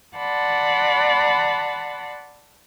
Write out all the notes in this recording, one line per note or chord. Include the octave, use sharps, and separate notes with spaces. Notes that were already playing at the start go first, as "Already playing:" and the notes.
D5 F#5 A5 B5 C6